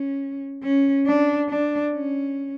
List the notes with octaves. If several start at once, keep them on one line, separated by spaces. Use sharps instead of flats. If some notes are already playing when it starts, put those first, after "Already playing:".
Already playing: C#4
C#4
D4
D4
C#4